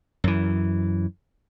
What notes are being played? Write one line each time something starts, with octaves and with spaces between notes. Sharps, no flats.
F#2 E3